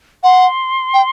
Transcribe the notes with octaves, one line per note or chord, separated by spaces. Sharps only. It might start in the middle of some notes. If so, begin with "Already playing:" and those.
F#5 C6
G5